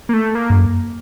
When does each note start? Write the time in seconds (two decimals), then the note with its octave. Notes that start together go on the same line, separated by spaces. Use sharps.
0.09 A#3
0.13 A3
0.35 A#3
0.50 G2
0.56 F#2